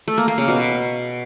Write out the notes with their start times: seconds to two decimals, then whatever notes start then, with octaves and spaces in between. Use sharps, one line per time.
0.08 A3
0.18 A#3
0.28 A#3
0.38 C#3
0.48 B2